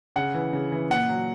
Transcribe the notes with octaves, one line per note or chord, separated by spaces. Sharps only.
C#3 F#5
E3
C#3
E3
A#2 F#5
F#3